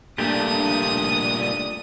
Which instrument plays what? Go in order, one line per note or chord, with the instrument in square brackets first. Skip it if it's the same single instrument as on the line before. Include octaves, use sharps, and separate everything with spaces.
[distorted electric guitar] G2 A#2 [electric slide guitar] A3 G4 [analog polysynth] D4 [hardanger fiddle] D#6